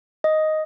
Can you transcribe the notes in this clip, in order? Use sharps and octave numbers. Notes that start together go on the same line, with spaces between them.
D#5